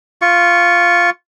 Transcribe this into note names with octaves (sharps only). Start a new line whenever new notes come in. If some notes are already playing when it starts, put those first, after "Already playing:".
F4 C#6